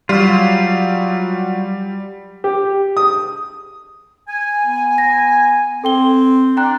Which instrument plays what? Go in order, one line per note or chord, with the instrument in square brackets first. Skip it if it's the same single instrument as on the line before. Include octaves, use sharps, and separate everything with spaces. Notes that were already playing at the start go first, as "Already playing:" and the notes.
[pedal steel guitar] F#3 F4 [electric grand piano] G3
[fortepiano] G4
D#6
[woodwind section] G#5
[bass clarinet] B3
[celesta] A#6
[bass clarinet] C4 [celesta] A4 G5 G7
[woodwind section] D4 [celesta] G5 A#5 F#6